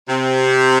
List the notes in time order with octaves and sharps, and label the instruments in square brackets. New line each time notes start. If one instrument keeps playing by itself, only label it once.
[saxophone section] C3